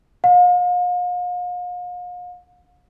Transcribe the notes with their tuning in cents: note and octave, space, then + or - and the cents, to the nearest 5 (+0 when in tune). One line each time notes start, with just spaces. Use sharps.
F5 +40